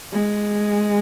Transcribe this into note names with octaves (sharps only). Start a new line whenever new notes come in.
G#3